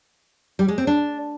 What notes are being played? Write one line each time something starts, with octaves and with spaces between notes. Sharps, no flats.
G3
G#3
C4
D4